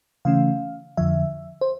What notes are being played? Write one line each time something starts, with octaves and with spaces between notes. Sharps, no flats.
C#3 E3 A3 C#4 F5
F2 D3 F3 E5
C5